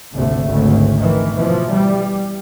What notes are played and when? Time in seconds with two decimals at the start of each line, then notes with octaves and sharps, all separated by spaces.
0.14 G#1 D2 C3 A3
0.47 G#1 D2 C#3
0.99 D#3 E3
1.35 B2 E3 F3
1.72 G3